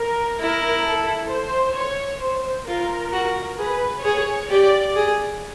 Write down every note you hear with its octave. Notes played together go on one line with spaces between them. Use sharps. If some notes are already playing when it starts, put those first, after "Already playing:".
Already playing: A#4
E4 A#4
A4
C5
C#5
C5
F4 A#4
F#4
G#4 B4
G#4 C#5
G4 D5
G#4